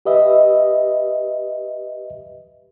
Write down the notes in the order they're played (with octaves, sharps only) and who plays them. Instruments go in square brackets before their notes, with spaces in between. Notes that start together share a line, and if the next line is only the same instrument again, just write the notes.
[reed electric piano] G4 B4 D#5 E5